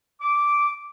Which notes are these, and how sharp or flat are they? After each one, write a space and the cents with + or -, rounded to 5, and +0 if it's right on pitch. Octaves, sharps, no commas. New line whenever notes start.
D6 -5